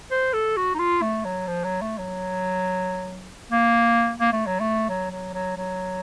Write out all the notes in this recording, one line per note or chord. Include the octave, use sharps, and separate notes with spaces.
C5
A4
F#4
D#4
F4
A3
F#3
F3
F#3
A3
F#3
A#3
A#3
A3
F#3
A3
F#3
F#3
F#3
F#3